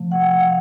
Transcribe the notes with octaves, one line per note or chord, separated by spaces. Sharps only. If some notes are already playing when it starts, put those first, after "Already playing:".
Already playing: C3 F3 A3
F#5
G5
F#5
F5